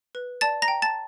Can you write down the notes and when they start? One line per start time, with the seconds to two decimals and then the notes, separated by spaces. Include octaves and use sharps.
0.15 B4
0.41 D5 A5 A6
0.62 A#5 A#6
0.68 G5
0.82 A5 A6